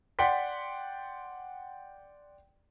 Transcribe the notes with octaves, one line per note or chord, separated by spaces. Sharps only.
D5 F#5 G5 C6 B6